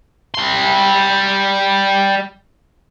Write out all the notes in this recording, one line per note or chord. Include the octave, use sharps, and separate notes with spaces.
G3 C6